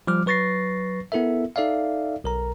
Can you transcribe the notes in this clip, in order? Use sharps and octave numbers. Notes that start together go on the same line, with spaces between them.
F3 G3 D6 F6
F#3 B4 C#6 A6 A#6 C7
B3 E4 A4 A#4 E5
D#4 A4 D5 E5 F5
B1 A#4 A#5